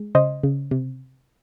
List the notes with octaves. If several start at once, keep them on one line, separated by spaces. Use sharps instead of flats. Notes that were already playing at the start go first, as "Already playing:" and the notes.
Already playing: G#3
C#3 C5 D#5
C#3
C3